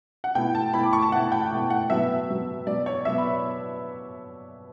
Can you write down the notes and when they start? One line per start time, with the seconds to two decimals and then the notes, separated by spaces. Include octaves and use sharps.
0.24 F#5
0.35 B2 A3 E4 G5
0.55 A5
0.74 B2 A3 E4 B5
0.83 D6
0.93 C#6
1.02 A5
1.12 B2 A3 E4 F#5
1.32 G5
1.51 B2 A3 E4
1.70 F#5
1.90 B2 F#3 B3 E5
2.28 B2 F#3 B3
2.66 B2 F#3 B3 D5
2.86 C#5
3.05 B2 F#3 B3 E5
3.18 B5